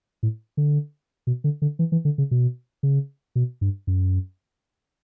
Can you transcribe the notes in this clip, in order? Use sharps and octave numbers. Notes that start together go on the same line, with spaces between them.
A2
D3
B2
D3
D3
E3
E3
D3
C#3
B2
C#3
B2
G2
F#2